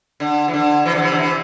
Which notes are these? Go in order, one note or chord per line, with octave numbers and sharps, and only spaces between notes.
D3
E3
D3
C3 E3
D3
C3 E3
D3
C3 E3